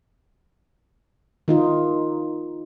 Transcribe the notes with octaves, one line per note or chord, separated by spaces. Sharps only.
D#3 D#4 F4